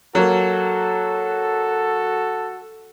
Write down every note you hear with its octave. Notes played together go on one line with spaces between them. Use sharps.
F#3 A#3 F#4 A4